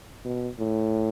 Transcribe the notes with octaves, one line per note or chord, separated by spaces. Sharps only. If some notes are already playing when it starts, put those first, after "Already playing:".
B2
A2